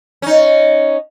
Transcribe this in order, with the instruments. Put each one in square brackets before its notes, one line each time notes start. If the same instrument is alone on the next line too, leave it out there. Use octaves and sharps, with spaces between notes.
[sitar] C#4 D#4